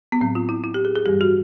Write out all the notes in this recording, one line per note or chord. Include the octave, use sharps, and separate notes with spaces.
B3
A2 F#3 C4
F4
E4
E4
G4
G#4
G#4
G2 E3 G3 G4
F#4